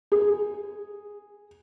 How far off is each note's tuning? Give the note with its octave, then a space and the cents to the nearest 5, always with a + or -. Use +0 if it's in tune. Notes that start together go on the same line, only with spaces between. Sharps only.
G#4 -5